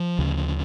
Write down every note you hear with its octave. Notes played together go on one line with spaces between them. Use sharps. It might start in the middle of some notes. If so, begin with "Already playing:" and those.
Already playing: F3
D2 C#3